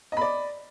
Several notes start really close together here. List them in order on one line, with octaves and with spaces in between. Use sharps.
D#5 B5 D5